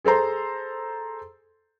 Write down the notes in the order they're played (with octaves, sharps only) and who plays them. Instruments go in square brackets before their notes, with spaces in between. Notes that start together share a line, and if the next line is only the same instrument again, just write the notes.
[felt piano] G#4 A4 C5 A#5 C6